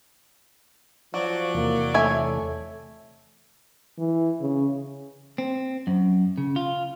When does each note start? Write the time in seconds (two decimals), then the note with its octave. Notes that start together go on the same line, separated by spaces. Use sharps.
1.14 F3 F#3 F#4 D5
1.55 E2 C3 E3 A#3
1.94 A3 C#5 E5 G#5
3.99 E3
4.41 C#3
5.38 C4
5.87 F#2
6.38 C#3
6.56 F4